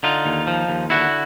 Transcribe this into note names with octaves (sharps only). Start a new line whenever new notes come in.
D3 D#4 F4
D#2
F3
D#2
D3 E4 F#4